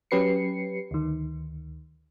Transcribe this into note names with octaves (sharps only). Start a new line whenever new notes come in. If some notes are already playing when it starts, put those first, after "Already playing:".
F#3 C#4 G4 B4 C7 C#7
D2 D#3